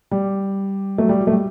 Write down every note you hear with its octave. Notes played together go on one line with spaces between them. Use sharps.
G3
F#3 A3
G3
F#3
A3
G3